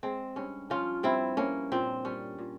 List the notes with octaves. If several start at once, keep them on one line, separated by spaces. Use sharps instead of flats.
G#3 C4
G2 C#4
F3 C#4 F4
G2 C4 E4
A#3 C#4
A#2 C4
G3 C#4
A#2